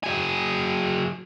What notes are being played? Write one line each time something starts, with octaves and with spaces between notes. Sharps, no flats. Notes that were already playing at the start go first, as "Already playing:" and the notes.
F#3 G#4